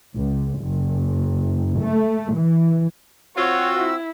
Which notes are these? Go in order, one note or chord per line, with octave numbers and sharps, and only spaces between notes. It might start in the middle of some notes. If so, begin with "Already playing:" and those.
C#2
F#1
A3
E3
C4 F4 F#4 C#5 E6
E4